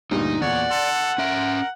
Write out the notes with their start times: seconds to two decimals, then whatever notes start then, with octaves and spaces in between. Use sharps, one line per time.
0.11 D2 G2 A#2 D#4
0.42 E2 A#2 C#5 D5 F#5
0.70 A4 C6
1.18 C#4 A#4 E5